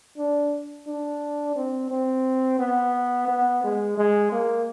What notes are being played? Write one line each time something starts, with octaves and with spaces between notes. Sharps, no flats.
D4
D4
C4
C4
B3
B3
G#3
G#3
A#3